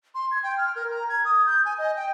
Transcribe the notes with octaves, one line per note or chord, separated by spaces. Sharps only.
C6
G#6
G5
F6
A#4
A#5
G#6
D#6
G6
G#5
D#5
G5